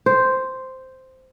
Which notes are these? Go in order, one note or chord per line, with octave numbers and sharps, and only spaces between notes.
C5